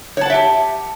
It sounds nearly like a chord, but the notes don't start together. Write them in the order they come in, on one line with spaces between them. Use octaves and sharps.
C#5 A5 F#5 E5 G4